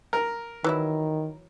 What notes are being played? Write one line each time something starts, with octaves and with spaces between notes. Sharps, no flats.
A#4
D#3 E3 F#3 E4